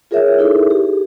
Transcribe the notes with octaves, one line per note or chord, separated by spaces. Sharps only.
F4 G#4 A#4 C#5 E5
D#4 E4 G#4 A4
G4